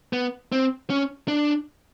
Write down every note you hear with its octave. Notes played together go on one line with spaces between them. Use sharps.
B3
C4
C#4
D4